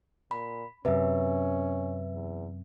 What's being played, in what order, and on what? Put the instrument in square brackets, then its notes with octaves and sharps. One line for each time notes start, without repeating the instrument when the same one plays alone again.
[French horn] A#2 [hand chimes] B5
[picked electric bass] F#2 C3 [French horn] C#4 [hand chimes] B4 E5
[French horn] E2